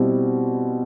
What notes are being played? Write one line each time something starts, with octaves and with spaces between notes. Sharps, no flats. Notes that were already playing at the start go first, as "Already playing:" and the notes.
Already playing: B2 G3 C4 E4